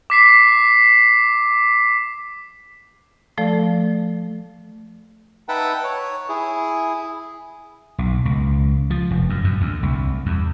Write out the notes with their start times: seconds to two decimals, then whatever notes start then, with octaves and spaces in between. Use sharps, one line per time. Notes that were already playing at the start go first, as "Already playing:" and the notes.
0.10 D6 B6 C7
3.38 F3 A3 A4 D5
5.49 D#4 B4 E5 F#5 G5 A5
5.84 C#5
6.29 E4 G#4
7.99 B1
8.25 C#2
8.90 F3
9.11 F1
9.30 F#2
9.44 F#2
9.61 D2
9.83 C2
10.26 E2